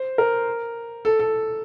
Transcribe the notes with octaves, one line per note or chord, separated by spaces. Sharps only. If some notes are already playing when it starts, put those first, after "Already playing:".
Already playing: C5
A#4
A4
A4